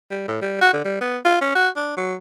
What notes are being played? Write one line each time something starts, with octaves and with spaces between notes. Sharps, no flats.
G3
A2
G3
F#4
D3
G3
B3
F4
C#4
F#4
D4
F#3